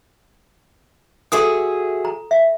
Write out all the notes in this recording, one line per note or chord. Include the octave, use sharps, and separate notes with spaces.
F#4 G#4 A4 E5 C6 D#6
A#5
E5